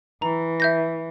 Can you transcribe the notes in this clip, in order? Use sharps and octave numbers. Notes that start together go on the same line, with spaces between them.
E3 A#5
E5 G6 A#6